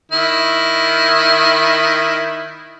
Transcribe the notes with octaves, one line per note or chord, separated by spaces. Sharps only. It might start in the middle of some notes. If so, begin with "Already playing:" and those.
D#3 E4